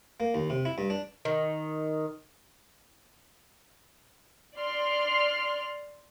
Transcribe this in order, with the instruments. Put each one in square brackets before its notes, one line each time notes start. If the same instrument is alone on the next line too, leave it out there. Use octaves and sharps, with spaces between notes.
[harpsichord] A#3
D#2
C3
E4
G2
D4
[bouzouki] D#3
[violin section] D5 C6 F6